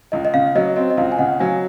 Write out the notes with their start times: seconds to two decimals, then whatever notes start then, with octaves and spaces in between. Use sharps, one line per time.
0.12 C#2 D#5
0.25 D#5
0.34 C#3 F5
0.55 F#3 D#5
0.76 C4 D#5
0.90 D#5
0.97 C#2 F5
1.12 G#5
1.18 C#3 D#5 F#5
1.40 F#3 F5 G#5